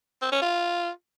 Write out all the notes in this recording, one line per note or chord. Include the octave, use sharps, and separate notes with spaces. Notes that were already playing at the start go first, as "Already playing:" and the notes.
C4
C#4
F4